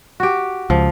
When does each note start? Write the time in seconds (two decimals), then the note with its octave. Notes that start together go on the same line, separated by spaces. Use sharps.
0.20 F#4 G4
0.70 C#2 F3